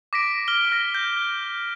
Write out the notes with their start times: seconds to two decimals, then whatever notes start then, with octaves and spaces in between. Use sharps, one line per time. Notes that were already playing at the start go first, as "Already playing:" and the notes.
0.13 D6 A#6 B6 D7
0.48 F6 G7
0.72 F6 A#6 G7
0.95 G6